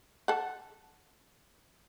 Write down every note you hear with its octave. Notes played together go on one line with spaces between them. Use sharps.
A4 F#5